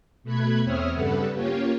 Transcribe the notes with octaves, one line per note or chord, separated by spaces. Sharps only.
B2 A3 B5 F#6 G#6
E2 C4 C#5 E5 D#6 F6
G2 C#3 G3 A4 B4 F#5
A#3 C#4 F4 G4 C#5